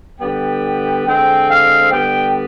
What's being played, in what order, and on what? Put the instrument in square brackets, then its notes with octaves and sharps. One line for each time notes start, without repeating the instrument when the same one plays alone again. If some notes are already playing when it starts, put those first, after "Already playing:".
[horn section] D3 G3 B3 G5
D3 G#3 C4 G5
F5
D3 G3 B3 G5